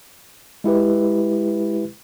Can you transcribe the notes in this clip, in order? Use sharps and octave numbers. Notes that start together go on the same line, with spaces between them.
G#3 E4 G4 B4